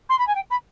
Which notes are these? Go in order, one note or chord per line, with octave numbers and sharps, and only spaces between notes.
C6
B5
G#5
G5
B5